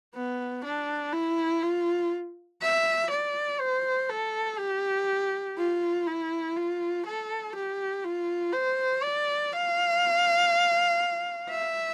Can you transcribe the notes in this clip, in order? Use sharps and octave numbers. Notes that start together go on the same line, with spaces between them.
B3
D4
E4
F4
E5
D5
C5
A4
G4
F4
E4
F4
A4
G4
F4
C5
D5
F5
E5